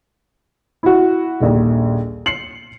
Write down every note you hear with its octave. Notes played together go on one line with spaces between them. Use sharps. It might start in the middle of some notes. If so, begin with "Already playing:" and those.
E4 F#4
D#1 A#1 D#2
C7 C#7 F#7